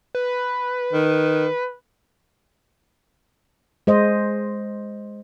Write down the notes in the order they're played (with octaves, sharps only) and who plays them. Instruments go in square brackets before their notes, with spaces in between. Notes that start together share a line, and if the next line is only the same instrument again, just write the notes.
[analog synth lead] B4
[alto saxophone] D#3
[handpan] G#3 C5 D#5